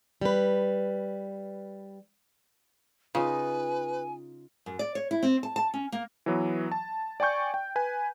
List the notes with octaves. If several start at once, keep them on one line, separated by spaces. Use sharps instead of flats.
G3 B4
C#3 D#4 F4 B4 G#5
F#2
D5
C#5
E4
C4
A5
A5
C#4
A#3
E3 F#3 B3
A5
D5 G5 G#5 C#6 G6
G5
B4 G#5